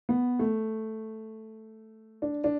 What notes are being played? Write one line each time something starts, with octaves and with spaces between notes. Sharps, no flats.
B3
A3
D4
D4